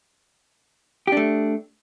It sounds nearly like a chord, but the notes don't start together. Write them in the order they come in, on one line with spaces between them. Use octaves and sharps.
G4 D4 A3